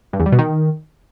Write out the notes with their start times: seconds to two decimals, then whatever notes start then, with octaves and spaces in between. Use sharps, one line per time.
0.13 G2
0.20 E2
0.26 G3
0.32 B2
0.39 D#3